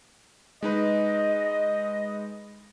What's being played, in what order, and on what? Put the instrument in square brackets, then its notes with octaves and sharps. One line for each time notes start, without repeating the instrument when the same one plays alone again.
[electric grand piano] G#3 D#4 B4 [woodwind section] D#5